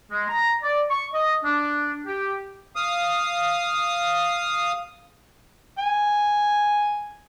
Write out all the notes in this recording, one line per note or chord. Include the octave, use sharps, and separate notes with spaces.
G#3
A#5
D5
C#6
D#5
D4
G4
F5 D#6
G#5